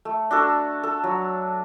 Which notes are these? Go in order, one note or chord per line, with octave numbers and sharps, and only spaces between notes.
A3
D4 F#4 A4
A4
F#3